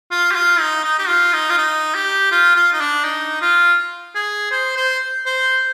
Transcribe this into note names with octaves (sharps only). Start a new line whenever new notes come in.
F4
G4
F4
D#4
D#4
G4
F4
D#4
F4
D#4
G4
F4
F4
D#4
D4
D#4
F4
G#4
C5
C5
C5